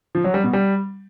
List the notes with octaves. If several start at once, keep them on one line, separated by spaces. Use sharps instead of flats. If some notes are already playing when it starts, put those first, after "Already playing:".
F3
F#3
G3
B2
G3